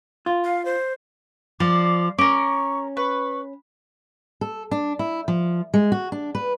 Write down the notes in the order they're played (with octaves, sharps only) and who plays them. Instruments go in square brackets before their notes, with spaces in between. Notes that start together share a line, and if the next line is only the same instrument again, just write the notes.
[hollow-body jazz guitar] F4
[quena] F5
C5
[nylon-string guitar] F3 [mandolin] D5 [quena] D6
[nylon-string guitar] C#4 [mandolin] A#4 D6 [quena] C#6
[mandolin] B4 [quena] C#6
[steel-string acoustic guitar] A4
D4
E4
F3
G#3
F#4
D4
B4